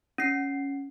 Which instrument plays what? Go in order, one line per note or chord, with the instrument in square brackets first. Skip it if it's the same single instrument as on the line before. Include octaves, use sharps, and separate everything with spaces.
[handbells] C#4 C7